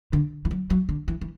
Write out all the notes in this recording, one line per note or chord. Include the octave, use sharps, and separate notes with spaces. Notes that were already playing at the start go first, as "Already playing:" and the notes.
D3
E3
F#3
F#3
D3
E3
E3